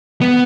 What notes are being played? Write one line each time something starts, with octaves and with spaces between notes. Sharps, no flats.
B3